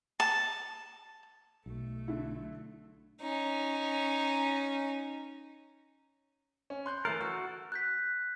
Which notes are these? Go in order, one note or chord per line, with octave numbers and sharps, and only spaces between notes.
A5
B1 A3
D3 E4
C#4 D#4
C#4
C6 F#6 G6
E3 A3 A#4 F#6 A6 C7
F#4 E6
F#6 G6 B6